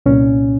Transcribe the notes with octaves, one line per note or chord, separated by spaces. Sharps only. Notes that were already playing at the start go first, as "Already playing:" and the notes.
C2 A#2 C#4